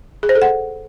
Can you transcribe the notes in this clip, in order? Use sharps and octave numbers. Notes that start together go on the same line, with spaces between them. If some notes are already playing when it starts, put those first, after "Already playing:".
G#4
C5
A4
F#5